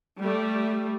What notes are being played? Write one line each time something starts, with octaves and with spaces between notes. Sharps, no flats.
G3 A3